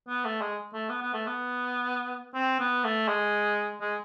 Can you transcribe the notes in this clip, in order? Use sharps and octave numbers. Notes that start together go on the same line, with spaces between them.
B3
A3
G#3
A3
B3
B3
A3
B3
C4
B3
A3
G#3
G#3